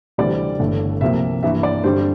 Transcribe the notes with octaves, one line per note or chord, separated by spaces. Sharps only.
D2 C3 E3 G3 C4 D5
G1 G2 E3 A3
C2 C3 F3 A#3 E5
G2 E3 A#3 E5
D5
G2 D3 G3 C4 C5